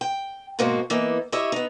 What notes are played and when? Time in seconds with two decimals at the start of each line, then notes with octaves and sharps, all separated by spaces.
0.01 G5
0.59 G#2 B2 A#3 C4 F#4
0.90 E3 A#3 B3 D#4
1.32 E4 G4 C#5 D#5 E5
1.52 B3 D#4